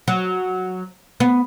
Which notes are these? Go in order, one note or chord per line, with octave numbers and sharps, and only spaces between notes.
F#3
B3